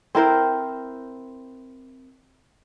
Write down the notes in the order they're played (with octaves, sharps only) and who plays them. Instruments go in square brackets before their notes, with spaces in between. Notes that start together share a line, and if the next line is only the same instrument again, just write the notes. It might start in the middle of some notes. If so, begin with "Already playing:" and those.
[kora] C4 E4 A#4 C5